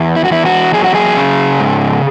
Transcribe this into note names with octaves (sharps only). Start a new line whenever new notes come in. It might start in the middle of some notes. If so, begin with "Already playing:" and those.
Already playing: E2
E4
F#4
E2 E4
F#4
F#3 G#4
F#4
G#4
C#3
G#2